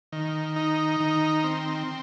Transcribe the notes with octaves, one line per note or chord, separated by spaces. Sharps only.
D#3
D#4
D#3
C4